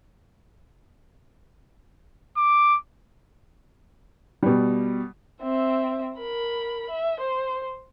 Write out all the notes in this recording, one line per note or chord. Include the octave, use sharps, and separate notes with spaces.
D6
B2 G3
C4 E5
A#4 B5
E5
C5